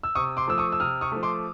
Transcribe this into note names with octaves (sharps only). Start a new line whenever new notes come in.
E6
C3 C#6 D#6
C6 D6
F3 A3 E6
C#6 D#6
E6
C3 D#6 F6
C#6 D#6
F3 A3
C6 D6